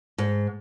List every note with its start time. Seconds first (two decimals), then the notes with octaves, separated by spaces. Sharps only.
0.18 G#2